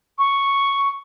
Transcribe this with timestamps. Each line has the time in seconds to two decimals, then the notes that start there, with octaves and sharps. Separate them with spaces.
0.19 C#6